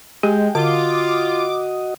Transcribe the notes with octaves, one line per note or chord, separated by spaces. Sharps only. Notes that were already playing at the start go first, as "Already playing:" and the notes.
G#3 G4 G5
D3 F4 F#4 D#5 D6